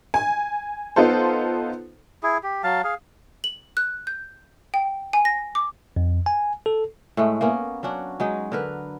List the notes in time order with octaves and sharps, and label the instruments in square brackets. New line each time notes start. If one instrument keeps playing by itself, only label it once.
[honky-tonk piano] G#5
B3 D#4 F4 A4 C5
[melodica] E4 G#4
G4
F#3 F5 A5
G#4 F5
[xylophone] F#7
F#6
G6
G5
G#5
A#6
D6
[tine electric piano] F2
G#5
A4
[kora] A2 G#3 A3
A#3 B3 C#4
F#3 C#4 D4 F#4
F#3 G#3 D#4
D3 A#4 B4